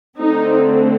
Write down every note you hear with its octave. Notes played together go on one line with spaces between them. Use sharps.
D3 A3 C4 D#4